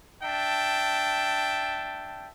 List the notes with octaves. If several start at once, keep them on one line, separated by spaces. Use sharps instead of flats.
D4 E5 G5 A5